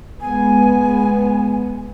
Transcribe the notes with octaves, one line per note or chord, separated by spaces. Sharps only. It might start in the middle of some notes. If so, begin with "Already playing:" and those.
G#3 B3 G#5